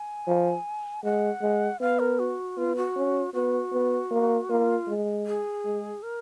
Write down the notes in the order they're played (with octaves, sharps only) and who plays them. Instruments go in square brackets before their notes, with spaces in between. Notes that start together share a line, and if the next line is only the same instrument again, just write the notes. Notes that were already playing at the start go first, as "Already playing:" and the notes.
Already playing: [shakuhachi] G#5
[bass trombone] F3
[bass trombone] G#3 [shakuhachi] F#5
[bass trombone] G#3
[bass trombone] B3 [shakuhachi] F5
[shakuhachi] A#4
F#4
[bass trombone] B3 [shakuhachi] F4
[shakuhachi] F#4
[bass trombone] C#4
[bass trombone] B3 [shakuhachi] F#4
[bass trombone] B3
A#3
[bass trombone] A#3 [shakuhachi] F4
[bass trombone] G#3
[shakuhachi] G#4
[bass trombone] G#3
[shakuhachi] A#4